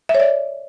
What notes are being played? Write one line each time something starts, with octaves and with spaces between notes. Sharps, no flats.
E5
C#5
D5